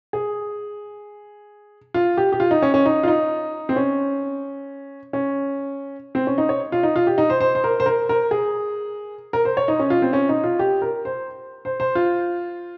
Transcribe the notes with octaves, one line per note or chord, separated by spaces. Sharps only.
G#4
F4
G4
G4
F4
D#4
C#4
C#4
D#4
F4
D#4
C4
C#4
C#4
C4
C#4
D#4
C#5
F4
D#4
F4
G4
D#4
C5
C5
C5
A#4
C5
A#4
A#4
G#4
A#4
C5
C#5
D#4
C#4
F4
C4
C#4
D#4
F4
G4
A#4
C5
C5
C5
F4